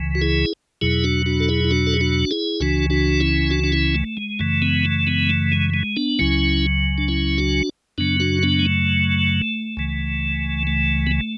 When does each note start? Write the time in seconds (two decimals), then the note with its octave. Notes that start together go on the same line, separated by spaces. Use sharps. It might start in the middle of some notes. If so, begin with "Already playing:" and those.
Already playing: C#2 C#3 E3
0.15 F#4
0.21 E4 G#4
0.81 E2 B2 F#3 E4 G#4
1.04 D4 F#4
1.26 D4 F#4
1.40 A4
1.48 E4 G#4
1.64 E4
1.71 D4 F#4
1.87 A4
1.94 G#4
2.01 D4 F#4
2.31 E4 G#4
2.60 C#2 C#3 E3 D4 F#4
2.90 D4 F#4
3.20 C#4 E4
3.50 D4 F#4
3.64 D4
3.72 C#4 E4
3.95 A3
4.17 G#3
4.39 F#2 C#3 E3 A3
4.62 G#3 B3
4.85 A3
5.07 G#3 B3
5.29 A3
5.52 G#3
5.74 G#3
5.96 B3 D4
6.19 C#2 C#3 F#3 C#4 E4
6.98 D4
7.08 C#4 E4
7.38 D4 F#4
7.98 F#2 C#3 F#3 B3 D4
8.20 D4 F#4
8.43 B3 D4
8.59 G#3
8.66 A3
9.77 C#2 C#3 E3
10.67 A3
11.07 B3
11.11 A3